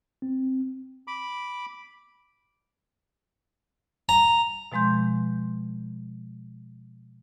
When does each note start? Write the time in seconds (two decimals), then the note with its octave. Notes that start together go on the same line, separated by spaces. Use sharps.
0.22 C4
1.07 B5 D6
4.09 A#5
4.72 B2 F3 G#3 C6 G6